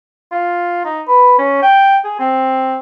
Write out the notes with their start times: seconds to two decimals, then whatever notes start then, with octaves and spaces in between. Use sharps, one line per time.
0.32 F4
0.85 D#4
1.08 B4
1.38 C#4
1.62 G5
2.04 G#4
2.19 C4